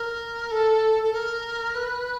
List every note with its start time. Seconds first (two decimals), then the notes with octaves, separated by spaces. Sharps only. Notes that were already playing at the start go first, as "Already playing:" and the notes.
Already playing: A#4
0.51 A4
1.03 A4
1.13 A#4
1.75 B4